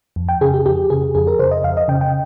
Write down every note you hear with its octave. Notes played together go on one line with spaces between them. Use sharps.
F2
G5
C#3 G#4
G4
F2 G4
C#3 G#4
F2 G#4
A#4
C#3 C5
D#5
F2 F5
D#5
C#3 G5
G5